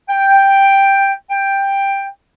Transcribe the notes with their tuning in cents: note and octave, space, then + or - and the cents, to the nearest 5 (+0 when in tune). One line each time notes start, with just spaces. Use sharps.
G5 +5
G5 +10